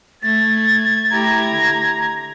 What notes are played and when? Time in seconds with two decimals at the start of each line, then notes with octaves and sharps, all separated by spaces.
0.23 A3 G#6 A6
1.11 A3 E4 G4 A#5
1.48 D3